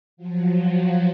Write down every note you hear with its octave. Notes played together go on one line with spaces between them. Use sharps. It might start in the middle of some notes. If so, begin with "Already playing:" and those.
F3 F#3